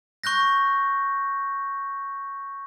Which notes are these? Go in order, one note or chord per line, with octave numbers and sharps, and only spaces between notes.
C#6 F#6 G6 A#6